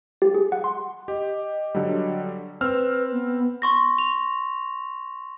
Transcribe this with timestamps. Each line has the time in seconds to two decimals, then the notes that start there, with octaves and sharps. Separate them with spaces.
0.22 G4
0.34 G#4
0.52 F#5
0.64 C6
1.08 G4 D#5
1.75 D3 F#3 G3
2.61 C4 B4 E6 F6
3.12 B3
3.62 C6 C#6 A#6
3.98 F7